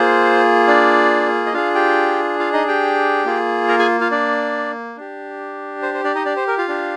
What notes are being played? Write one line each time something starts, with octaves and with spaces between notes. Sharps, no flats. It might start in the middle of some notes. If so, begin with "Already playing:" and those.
Already playing: A#3 F4 G#4 C5
D4 D5
D#5
D4 F4 G#4 F5
G4 G5
F4 F5
D#4 D#5
G4 G5
A#3 F4 G#4
A#4 A#5
G#4 G#5
F4 F5
D4 D5
D4 G4
C5
C5
D4 D5
D#4 D#5
D4 D5
C5
A#4
F4 F5
D4 G4